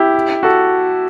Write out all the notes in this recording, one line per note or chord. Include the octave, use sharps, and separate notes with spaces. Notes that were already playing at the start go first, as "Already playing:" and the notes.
Already playing: E4 G4
F#4 A4